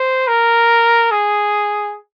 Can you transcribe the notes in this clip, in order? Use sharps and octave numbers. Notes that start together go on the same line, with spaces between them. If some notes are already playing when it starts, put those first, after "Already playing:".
Already playing: C5
A#4
G#4